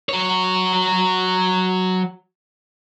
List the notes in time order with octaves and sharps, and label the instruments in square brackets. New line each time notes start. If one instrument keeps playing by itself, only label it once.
[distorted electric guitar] F#3 C#5